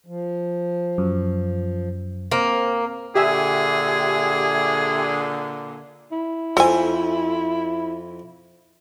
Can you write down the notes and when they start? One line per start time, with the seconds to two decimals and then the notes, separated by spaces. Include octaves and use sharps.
0.06 F3
0.98 F#2
2.32 A#3 C4 C5
3.15 A#2 D3 G4 G#4 E5 G#5
6.12 E4
6.57 F2 A4 C5 E5 G#5